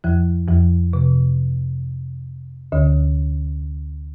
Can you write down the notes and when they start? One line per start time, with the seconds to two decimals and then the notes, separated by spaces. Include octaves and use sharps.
0.04 F2 F3
0.48 F2 F3
0.93 C3
2.72 D2 D3